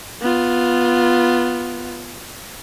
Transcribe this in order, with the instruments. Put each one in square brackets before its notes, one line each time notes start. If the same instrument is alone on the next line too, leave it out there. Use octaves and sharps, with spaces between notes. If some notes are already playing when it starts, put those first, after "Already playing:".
[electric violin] B3 F4